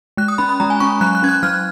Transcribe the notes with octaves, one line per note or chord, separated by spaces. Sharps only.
G#3 F#6
D#6
C#4 B5
B5
G#3 A#5
G#5
C#4 C#6
F#3 F#6
F#6
C#4 G#6
F#6
F#3 F6